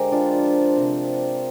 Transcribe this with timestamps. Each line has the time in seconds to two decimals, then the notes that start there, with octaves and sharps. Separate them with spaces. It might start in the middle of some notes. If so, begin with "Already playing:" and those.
Already playing: D3 G#3 G4 A#4 C5
0.12 D4 F4
0.34 F3
0.77 C3